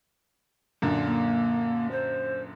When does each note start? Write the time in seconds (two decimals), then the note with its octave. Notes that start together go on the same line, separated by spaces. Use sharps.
0.82 F#2 A#2 D3
1.05 A#3
1.91 C5